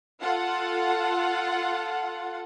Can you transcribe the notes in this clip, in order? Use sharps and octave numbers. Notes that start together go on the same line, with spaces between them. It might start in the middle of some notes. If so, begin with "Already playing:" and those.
F4 A4 F#5